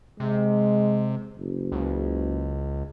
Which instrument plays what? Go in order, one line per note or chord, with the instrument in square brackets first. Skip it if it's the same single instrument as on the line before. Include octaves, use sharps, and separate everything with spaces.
[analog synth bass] C3 [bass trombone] G#3
[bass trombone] F#1
[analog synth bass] C#2